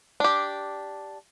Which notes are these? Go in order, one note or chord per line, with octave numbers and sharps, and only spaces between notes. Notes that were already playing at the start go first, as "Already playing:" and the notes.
D4 G4